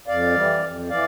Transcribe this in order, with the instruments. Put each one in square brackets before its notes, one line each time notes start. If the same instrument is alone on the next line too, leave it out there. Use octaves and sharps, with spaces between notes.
[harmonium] F2 D5 F5
E3 G3
F2
E3 D5 F5